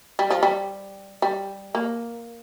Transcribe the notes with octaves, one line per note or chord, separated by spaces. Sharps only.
G3
F3
G3
G3
A#3